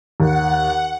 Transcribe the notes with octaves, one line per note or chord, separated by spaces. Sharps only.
D#2 F#5